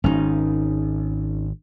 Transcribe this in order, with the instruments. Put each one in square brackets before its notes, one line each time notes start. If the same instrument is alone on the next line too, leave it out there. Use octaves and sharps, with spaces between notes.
[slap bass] G#1 [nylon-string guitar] C#4 D#4